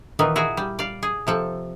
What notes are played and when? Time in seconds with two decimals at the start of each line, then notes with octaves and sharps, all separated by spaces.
0.19 A#2 D#3 E3 B3
0.36 E4 F#4 G#4 A#5
0.57 G3
0.79 D5 F5
1.03 G#4
1.27 C3 F3 A4